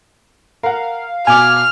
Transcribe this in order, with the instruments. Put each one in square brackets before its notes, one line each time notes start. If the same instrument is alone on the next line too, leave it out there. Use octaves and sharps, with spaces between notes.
[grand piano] A#4 F#5 [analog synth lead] F5
[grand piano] B2 F7 [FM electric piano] G#5 D6 [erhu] F6